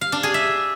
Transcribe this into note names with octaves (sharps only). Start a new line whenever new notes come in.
F5
D4
G#4
E5